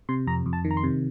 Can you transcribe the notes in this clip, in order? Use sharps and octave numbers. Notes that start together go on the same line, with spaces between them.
C3 C6
F2 A#5
F2
A5
D#3
A#5
C6
C3